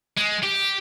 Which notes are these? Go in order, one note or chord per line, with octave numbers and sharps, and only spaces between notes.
G#3
G4